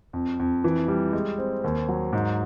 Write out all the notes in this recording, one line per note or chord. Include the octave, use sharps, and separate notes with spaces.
F2
F2
E3
G3
G#3
C4
D#2
F#3
G#2